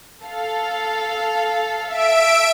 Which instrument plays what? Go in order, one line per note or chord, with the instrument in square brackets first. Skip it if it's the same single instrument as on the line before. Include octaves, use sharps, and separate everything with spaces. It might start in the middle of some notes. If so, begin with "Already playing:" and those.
[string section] A4 F5
[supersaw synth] E5 D7